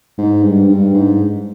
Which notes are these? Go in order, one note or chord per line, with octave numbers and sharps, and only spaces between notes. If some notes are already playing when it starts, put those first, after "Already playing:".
G#2
G2
G2
G#2